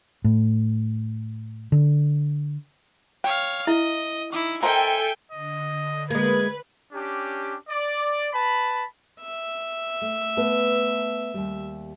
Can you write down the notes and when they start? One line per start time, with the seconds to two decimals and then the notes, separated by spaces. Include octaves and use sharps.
0.24 A2
1.72 D3
3.24 C#5 F5 G5
3.67 E4 D#5 E5
4.33 D#4 E4 D6
4.63 A4 A#4 C5 D#5 E5 G5 G#5
5.32 D3 D#5
6.10 G#3 A#3 B4 G#6
6.93 C#4 D4 G4
7.69 D5
8.33 B4 A5 B5
9.21 E5
10.01 A3
10.37 A3 B3 B4
11.34 D#2 G3